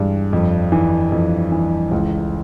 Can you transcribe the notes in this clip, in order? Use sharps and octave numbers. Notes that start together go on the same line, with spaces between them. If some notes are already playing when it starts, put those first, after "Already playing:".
Already playing: G2 E3 G#3
F2
E3
F2
E3
C#2